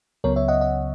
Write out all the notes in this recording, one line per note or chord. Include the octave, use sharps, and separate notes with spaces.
C#2 C#3 F#3 B3 A#4 C#5
C#5 E5
D#5 F#5
D#5 F#5